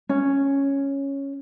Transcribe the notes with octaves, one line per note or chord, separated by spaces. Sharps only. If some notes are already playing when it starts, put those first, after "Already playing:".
C#4